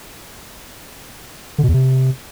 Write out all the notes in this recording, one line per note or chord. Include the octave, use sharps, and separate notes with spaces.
D3
B2
E2
C3